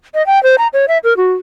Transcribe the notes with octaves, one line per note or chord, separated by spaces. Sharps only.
D#5
G5
C5
A#5
C#5
E5
A#4
F#4